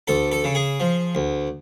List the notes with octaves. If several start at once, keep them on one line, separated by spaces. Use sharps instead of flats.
D2 A4
A4
C#3
G#4
F3
D2